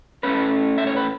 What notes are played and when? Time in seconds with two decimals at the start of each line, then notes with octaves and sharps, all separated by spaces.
0.23 A2 A3 C#4 B4
0.78 E5
0.87 C#5
0.96 B4